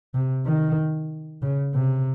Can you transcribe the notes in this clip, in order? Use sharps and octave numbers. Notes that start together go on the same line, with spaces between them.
C3
D#3
C#3
C3